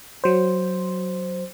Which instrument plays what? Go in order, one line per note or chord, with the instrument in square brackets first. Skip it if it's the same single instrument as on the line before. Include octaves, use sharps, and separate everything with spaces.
[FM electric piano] F#3 C5